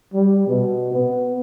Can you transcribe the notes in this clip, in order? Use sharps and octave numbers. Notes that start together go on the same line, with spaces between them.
G3
B2
B3